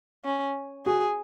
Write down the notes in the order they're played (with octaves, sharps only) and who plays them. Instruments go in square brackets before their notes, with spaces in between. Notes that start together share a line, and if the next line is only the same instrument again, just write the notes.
[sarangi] C#4
[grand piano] F#4 [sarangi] G#4